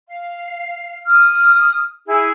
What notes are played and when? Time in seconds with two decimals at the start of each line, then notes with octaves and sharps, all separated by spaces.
0.07 F5
1.05 D#6 F6
2.07 E4 G#4